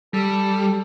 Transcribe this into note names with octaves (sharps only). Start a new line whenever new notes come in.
G3 A4